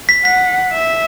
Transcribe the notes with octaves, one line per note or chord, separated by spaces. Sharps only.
B6
F#5 B6
E5